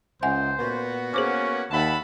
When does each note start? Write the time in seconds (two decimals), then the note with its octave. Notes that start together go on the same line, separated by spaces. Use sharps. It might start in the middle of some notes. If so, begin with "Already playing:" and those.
0.23 C#2 C5 E5 F#5 G#5
0.59 A#2 B3 F#4
1.14 A#3 C#4 G#4 C5 D6
1.71 D#2 E5 F#5 A5 B5